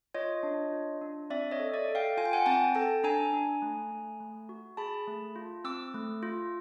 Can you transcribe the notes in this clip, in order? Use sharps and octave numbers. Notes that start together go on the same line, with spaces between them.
F4 C#5 D#5
D4
F4
D4
C4 D5 E5
C#5 D#5
A4
D5 E5
A4
F5 G5
F4 G#5
G5
F#5 G#5
C4 G5 A5
A4 G5 A5
D4 G#5 A#5
D4
A3
A3
A3
F#4
G#4 A5 B5
A3
F4
C4 D6 E6
A3
F4